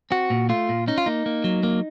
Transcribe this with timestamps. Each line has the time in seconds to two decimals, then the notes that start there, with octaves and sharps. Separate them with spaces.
0.11 C4 F#4
0.30 A#2
0.49 A3 F4
0.69 A#2
0.88 C#4 D#4
0.98 F4
1.06 A#3 D#4
1.26 A#3
1.44 F#3
1.63 A#3